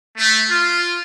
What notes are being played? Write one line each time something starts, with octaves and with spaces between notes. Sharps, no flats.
A3
F4